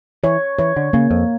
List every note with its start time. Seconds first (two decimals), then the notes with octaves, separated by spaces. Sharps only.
0.24 E3 C#5
0.58 E3 C#5
0.76 D3
0.93 C#3 A#3
1.11 F2